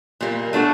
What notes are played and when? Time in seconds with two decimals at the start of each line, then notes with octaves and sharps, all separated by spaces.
0.21 A#2 G3 A#3
0.53 A3 D4 F#4 A4